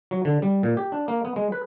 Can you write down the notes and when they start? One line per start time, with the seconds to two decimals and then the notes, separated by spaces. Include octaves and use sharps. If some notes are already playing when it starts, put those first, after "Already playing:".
0.11 F#3
0.25 D3
0.42 G3
0.63 A#2
0.77 G4
0.92 D4
1.08 A#3
1.25 B3
1.36 G#3
1.52 B4